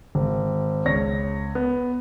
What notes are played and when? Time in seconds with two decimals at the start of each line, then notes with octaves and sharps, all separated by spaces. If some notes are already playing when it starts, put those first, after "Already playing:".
0.15 G#1
0.85 C#2 C#5 A#6
1.55 B3